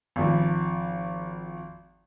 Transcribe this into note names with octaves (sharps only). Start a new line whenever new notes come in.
G#1 F3